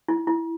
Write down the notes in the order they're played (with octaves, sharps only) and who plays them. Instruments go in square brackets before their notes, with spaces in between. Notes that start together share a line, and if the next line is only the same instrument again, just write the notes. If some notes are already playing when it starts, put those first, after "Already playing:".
[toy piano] E4
E4